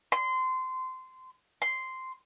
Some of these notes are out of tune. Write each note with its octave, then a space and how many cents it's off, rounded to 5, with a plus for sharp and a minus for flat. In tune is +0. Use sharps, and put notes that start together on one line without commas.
C6 -20
C6 -5